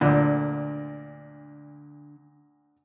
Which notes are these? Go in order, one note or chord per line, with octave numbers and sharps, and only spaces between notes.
D2 A#2 D3